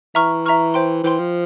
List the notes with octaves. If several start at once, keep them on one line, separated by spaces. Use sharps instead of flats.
E3 E5 A#5 C#6 F6
E5 A#5 C#6 F6
C5 G5 C6
E3 C5 G5 C6
F3